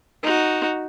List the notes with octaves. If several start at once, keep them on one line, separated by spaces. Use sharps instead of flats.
D#4 F#4